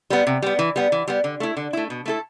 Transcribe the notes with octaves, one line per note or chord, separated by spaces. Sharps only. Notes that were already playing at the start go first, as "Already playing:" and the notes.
G3 B3
C3
G3 B3
E3
G3 B3
E3
G3 B3
D3
A3 E4
D3
A3 E4
B2
A3 E4 A4